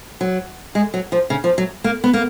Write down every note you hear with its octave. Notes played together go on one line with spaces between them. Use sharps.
F#3
G#3
F#3
F3
C#3
F3
F#3
A#3
B3
A#3